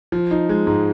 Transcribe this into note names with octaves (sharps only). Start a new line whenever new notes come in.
F3
D#4
G#3
G#2